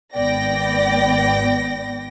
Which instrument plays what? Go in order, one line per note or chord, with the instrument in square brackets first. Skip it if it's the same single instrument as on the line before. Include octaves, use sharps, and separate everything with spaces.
[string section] G#1 B3 D5 G5 A#6